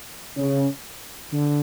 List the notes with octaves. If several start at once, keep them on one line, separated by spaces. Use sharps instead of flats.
C#3 C#4
D3